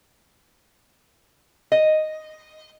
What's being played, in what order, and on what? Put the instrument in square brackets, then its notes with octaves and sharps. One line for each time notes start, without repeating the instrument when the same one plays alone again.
[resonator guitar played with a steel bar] D#5